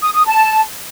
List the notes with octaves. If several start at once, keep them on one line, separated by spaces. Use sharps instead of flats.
D#6
D#6
A5